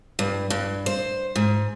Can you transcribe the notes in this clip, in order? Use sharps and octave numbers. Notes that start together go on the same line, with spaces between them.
G2
G2
C5
G#2